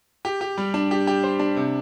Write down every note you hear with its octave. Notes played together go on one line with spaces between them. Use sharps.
G4
G4
G3
D4
G4
G4
C5
D4
C3